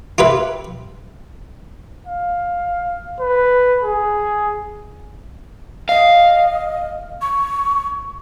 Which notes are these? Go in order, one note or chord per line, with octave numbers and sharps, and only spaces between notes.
F4 G4 B4 E5
F5
B4
G#4
D#5 F5
C#6